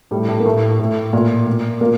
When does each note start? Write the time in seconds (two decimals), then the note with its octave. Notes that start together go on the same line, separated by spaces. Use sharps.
0.11 A2 G3
0.28 A2 A3
0.40 A#3
0.45 A2 A3
0.79 A2
1.13 A#2 A#3
1.47 A#2
1.81 A#2 A#3